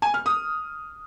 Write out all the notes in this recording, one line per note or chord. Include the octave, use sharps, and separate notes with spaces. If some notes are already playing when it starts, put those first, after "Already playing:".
G#5
F6
D#6